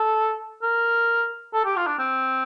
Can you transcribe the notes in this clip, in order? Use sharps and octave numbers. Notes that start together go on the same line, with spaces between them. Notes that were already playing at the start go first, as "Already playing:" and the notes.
Already playing: A4
A#4
A4
G4
F4
D4
C4